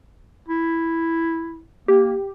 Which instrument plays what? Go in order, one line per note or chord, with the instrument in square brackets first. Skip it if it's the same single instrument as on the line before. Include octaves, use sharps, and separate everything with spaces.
[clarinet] E4
[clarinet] A#3 [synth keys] G4